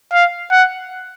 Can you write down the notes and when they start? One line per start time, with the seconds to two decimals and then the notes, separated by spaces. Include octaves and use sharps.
0.13 F5
0.51 F#5